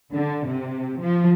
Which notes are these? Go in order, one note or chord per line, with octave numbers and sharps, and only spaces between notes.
D3
C3
F3